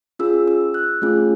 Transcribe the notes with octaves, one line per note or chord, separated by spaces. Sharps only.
C#4 F4 G#4 E6
E6
F#6
A3 C#4 F4 G#4